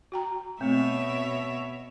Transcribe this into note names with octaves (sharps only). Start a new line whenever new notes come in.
F#4 G5 A#5
B2 A3 C4 C#5 E5